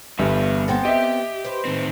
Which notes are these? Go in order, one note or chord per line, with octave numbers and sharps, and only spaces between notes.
G1 G2 G3 B3 E5
B3 C4 A4
G4 D#5 E5
B4 C5
A2 D#3 C4